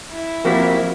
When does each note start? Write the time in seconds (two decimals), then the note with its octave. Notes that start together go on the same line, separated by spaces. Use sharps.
0.11 E4
0.45 F3 A#3 C4 F#4 G4 A#4 B6